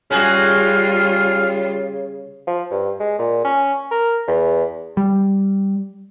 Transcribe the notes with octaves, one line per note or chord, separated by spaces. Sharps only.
C#3 G3 C#4 F4 F#4 G#4 F6
F3
G2
G#3
A#2
C#4
A#4
E2
G3